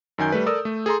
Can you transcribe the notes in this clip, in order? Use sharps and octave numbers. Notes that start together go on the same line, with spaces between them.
F#2 D#3 G#5 G6
G3 A3 B4
A4 A#4 D5 D#6 E6
A3
G#4 A4 A#5 C6